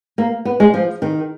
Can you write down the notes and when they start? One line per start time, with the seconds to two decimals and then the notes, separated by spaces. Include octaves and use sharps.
0.18 A#3
0.45 B3
0.60 G#3
0.74 F3
1.02 D#3